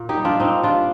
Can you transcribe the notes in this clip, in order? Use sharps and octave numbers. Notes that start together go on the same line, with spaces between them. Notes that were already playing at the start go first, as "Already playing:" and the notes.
Already playing: A#2
D#4 G4
G3
D4 F4
A#2 C4 D#4
G3 D4 F4